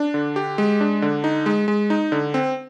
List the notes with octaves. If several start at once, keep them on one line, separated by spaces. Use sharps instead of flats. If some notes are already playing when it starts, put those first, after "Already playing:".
Already playing: D4
D3
G4
G#3
D4
D3
D#4
G#3
G#3
D#4
D3
C4